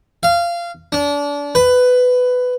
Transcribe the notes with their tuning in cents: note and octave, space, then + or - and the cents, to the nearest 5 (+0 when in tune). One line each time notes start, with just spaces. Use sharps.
F5 -20
D4 -30
B4 +15